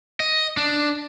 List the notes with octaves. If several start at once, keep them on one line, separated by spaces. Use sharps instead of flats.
D#5
D4